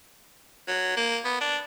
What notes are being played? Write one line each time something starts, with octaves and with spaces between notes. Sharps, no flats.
F#3
A#3
B3
D4